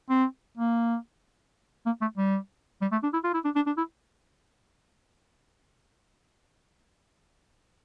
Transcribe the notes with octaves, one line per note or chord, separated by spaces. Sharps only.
C4
A#3
A#3
A3
G3
G3
A3
D4
E4
F4
E4
D4
D4
D4
E4